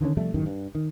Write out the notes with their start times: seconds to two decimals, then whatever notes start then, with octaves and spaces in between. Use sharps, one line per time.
0.01 D3 D#3 G#3 C#4
0.17 C3 F3 G3 A3
0.34 A1 F#2 D#3
0.46 G2
0.75 D#3